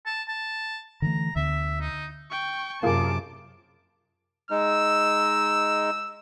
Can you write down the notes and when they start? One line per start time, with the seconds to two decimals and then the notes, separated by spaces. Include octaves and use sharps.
0.06 A5
0.28 A5
1.02 D3 E3 A3 A#5
1.36 D2 D3 B3 E5
1.81 D#4
2.31 G5 C#6
2.83 F#2 C3 A#3 F4 G#4 A5 D6
4.51 G#3 D#4 E6